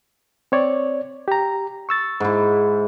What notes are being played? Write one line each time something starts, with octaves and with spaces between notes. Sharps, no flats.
C4 C#5 D5
G4 A#5
C#6 E6 A6
G#2 E4